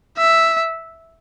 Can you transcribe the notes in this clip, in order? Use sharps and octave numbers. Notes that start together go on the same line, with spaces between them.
E5